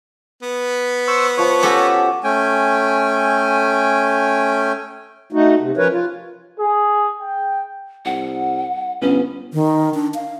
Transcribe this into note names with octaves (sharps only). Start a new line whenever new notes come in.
B3 B4
C5 C#6 E6
F3 C#5 E5
C#4 F#4 G4 A4
A3 C#4 G5 G#5
A3 D#4 F#4
C3
F3 C#4 A#4 B4 C#5
F4
G#4
G5
C2 F#5
G1 B3 C#4
D#3
D4
F5